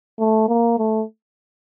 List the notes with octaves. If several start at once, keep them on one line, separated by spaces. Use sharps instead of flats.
A3
A#3
A3